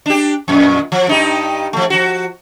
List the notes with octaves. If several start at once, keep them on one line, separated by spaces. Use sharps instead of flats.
D4 G4
F2 A#2
F3
G2 D#4 G4
F3 A3
F3 F#4